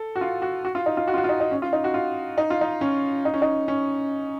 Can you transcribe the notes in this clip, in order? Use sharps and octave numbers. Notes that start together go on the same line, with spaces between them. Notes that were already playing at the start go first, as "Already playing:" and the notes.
Already playing: A4
F#4
F4
F#4
F#4
F4
D#4
F4
F#4
F4
F#4
F4
D#4
D#4
C#4
F4
D#4
F#4
F4
D#4
F4
D#4
C#4
D#4
C#4
D#4
C#4